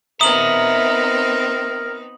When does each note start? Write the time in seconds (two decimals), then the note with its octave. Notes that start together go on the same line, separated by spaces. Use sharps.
0.21 B3 C4 D#4 A#4 E5 A#5 D#6 F#7